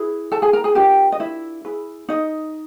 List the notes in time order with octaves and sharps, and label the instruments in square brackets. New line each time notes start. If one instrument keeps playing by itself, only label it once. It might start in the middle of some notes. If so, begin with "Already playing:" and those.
Already playing: [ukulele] E4 G#4 B4
A4 A5
G#4 G#5
A#4 A#5
G#4 G#5
D4 F4 G4 A#4 G5
D#5
E4 E5
E4 G#4 B4
D#4 D#5